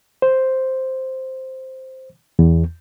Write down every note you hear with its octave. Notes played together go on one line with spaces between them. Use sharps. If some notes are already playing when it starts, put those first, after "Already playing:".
C5
E2